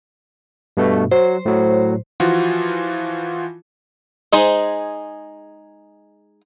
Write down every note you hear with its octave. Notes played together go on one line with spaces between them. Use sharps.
G2 B2 A3
F#3 C5
A2 F#3
E3 F3 F4 F#4
G#3 D#4 G#4 C5